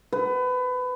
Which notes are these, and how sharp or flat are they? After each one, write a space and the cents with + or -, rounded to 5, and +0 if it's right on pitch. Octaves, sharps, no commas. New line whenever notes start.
B4 +25